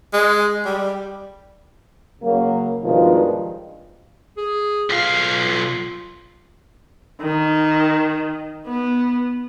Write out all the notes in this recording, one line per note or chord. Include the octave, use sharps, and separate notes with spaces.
G#3
G3
C#3 F#3 A#3
G2 B2 D#3 F3 G#3 F4
G#4
B1 F4 F5
D#3
B3